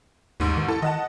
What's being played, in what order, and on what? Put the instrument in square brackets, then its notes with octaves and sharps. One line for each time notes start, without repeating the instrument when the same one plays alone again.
[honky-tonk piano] A1 G#2 [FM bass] D#2
[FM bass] D#3
[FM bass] E4 [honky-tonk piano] A4
[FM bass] D#3 [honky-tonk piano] D#5 F#5 A5